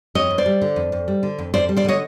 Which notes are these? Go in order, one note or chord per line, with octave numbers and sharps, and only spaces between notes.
F2 C#5 D#5
F2
C5 D5
G3
D3
F2
F2
G3
D3
F2
F2 C5 D5
G3
C5 D5
D3 C#5 D#5